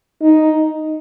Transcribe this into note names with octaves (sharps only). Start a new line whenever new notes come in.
D#4